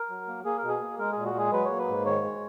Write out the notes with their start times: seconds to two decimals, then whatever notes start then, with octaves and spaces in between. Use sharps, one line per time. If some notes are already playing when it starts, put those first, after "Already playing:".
Already playing: A#4
0.10 F#3
0.28 A#3
0.45 A#3 G#4
0.57 A#4
0.63 B2
0.69 G#4
0.81 A#3
0.99 G#3 A#4
1.12 A#2 G#4
1.25 F#4
1.35 G#3 G#4
1.52 F#3 B4
1.65 C#5
1.71 A#3
1.78 B4
1.88 G#2
2.06 D#3 C#5
2.24 G#3